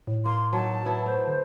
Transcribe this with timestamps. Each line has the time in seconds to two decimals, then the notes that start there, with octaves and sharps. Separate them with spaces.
0.07 A2
0.25 A#3 C6
0.53 F#3 D#4 A5
0.85 F#3 B3 E4
1.06 A3 C5
1.28 D3